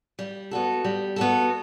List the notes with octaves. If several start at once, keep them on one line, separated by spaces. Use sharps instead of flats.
G3
B3 F#4 A4
G3
B3 F#4 A4